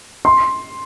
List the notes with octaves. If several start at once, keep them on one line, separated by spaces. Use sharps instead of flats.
C6